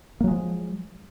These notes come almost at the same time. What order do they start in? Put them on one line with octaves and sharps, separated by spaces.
A#3 F#3 G#3 F3